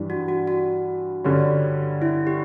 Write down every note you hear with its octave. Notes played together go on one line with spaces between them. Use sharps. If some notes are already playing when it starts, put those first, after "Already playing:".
Already playing: G2 E3 G3 D4
F#4
F#4
F#4
G2 D3 G3 C#4
E4
G4